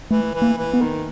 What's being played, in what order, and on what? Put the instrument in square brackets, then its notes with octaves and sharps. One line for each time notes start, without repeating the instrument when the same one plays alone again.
[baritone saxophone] E3 [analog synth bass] A3
[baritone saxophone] E3
[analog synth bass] A#3
[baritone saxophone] E3
[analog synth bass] B3
[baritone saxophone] D#3